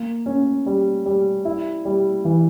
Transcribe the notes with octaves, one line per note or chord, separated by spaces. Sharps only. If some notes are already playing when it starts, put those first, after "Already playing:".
Already playing: A#3
C#4
G3
G3
E4
G3
E3